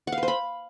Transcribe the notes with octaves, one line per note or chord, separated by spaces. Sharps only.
F#5
F5
B4
C5
B5